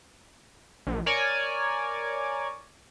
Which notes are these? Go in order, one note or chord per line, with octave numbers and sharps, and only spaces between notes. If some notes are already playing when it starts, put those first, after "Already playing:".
A#1
A#4 C#5 D5 G#5